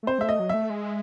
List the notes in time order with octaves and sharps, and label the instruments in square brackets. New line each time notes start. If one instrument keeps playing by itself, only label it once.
[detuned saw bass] A3
[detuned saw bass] C4 [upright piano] C5
[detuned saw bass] G#3 A3 [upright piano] E5
[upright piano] D#5
[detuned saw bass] F#3
[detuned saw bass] A3 [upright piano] E5
[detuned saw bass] G#3